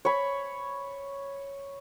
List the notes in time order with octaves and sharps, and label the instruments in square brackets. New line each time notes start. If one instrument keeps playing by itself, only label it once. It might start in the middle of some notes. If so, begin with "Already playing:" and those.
[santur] C#5 B5